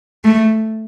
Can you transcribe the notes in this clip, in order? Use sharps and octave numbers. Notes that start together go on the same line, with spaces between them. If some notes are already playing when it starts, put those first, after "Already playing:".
A3